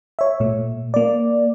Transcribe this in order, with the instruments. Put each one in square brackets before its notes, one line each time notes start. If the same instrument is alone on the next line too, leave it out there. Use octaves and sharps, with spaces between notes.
[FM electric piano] C#5 E5
A#2 A3
A#3 D5